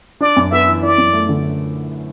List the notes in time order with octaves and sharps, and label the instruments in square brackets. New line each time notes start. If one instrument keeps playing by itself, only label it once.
[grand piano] D4 [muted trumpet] D5
[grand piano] F#2
[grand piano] B3 [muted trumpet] E5
[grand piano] E3
[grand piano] E4 [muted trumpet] D5
[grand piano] F#2
A3
D3